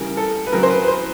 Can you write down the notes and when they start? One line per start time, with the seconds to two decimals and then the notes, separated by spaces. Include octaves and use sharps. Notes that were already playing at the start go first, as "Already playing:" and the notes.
Already playing: C#3 E3 G3 A#4
0.17 A4
0.47 B4
0.52 C#3 F#3 A#4
0.63 C5
0.70 B4
0.83 B4
0.88 C5